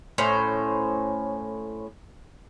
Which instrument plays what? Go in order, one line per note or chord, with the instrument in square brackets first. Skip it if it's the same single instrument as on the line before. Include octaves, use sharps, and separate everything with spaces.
[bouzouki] A2 C#4 C5